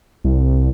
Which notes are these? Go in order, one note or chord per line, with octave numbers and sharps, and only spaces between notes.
C2